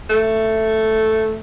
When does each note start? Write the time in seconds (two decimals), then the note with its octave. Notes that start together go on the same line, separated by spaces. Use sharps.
0.10 A3